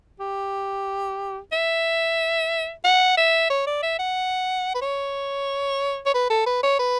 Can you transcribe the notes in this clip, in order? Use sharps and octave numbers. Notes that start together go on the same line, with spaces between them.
G4
E5
F#5
E5
C#5
D5
E5
F#5
B4
C#5
C#5
B4
A4
B4
C#5
B4